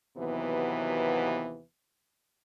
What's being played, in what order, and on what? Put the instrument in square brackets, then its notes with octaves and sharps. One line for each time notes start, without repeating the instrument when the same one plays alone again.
[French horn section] D#2 C3 E3 F#3 B3